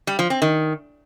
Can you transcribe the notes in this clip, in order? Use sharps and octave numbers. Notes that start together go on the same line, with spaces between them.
G3
F3
C4
D#3